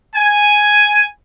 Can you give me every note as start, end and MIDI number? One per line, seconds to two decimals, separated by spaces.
0.15 1.02 80